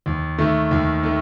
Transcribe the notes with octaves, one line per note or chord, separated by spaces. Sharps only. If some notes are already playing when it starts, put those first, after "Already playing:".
D#2
D#3 A3
D#2
D#3 A3